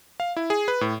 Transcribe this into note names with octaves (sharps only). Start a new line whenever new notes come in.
F5
E4
G#4
B4
A2